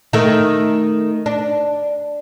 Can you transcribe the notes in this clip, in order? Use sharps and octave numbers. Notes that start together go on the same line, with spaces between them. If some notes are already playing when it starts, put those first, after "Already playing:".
D#3 A3
D4